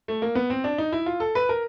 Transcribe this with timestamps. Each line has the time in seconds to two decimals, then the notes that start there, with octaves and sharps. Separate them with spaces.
0.08 A3
0.22 A#3
0.35 B3
0.50 C4
0.64 D4
0.78 D#4
0.92 E4
1.06 F4
1.20 A4
1.35 B4
1.49 A#4